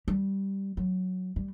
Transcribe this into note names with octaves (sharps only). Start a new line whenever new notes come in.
G3
F#3
G3